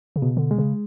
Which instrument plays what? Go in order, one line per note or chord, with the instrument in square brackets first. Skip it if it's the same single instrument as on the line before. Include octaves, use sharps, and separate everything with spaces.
[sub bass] C#3
[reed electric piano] B2
[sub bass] D3
[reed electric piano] G#3
[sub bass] C#3